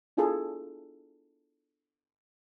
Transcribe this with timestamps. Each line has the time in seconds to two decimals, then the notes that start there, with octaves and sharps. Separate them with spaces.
0.17 B3 D4 E4 F4 G#4 A4